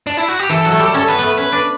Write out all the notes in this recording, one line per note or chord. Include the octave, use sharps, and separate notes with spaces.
D4
E4
F#4
G4
E3 A4
F#3
A3
G3
C#4 A4
B3 B4
A3 B3
C#4 B4
D4